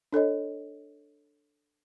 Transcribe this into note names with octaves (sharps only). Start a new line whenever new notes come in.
D4 A4 C#5 D#5